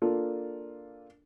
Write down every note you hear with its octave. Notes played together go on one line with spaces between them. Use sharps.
A#3 D4 F4 A4